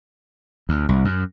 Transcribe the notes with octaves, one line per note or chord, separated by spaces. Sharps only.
D2
C2
F#2